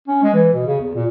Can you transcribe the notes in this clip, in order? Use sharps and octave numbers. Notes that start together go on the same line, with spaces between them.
C#4
G#3
E3
B2
C#3
E2
A#2